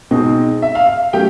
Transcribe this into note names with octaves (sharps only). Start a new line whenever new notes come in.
B2 G#3 C4 D#4
E5
F5
F5
F#3 A3 C#4 G4 G5